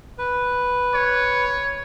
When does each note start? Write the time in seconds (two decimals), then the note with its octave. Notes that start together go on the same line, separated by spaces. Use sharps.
0.18 B4
0.95 C#5